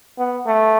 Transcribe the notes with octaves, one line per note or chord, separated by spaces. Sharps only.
B3
A3